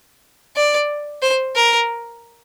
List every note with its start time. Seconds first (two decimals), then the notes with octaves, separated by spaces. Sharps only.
0.56 D5
1.22 C5
1.56 A#4